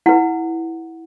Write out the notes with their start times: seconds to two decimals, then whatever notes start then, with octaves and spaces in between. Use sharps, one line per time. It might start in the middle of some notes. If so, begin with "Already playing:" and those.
0.06 E4 B4 F#5